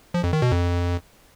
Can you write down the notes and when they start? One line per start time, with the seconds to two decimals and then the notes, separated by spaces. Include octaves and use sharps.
0.14 F3
0.24 F2
0.33 D#3
0.42 B2
0.52 F2